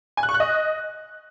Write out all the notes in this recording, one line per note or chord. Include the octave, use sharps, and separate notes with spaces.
G#5
F#6
C#6
F#6
D#5